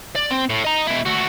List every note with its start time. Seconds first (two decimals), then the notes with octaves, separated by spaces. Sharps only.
0.15 D5
0.31 C4
0.50 A2
0.64 D#5 A#5
0.87 B2 E4
1.06 A3 F#4